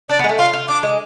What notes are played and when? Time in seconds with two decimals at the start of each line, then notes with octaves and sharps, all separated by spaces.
0.09 D4 D5
0.19 B3
0.24 G#3
0.29 A3
0.38 F4 F5
0.53 F4
0.68 D4 D6
0.83 G#3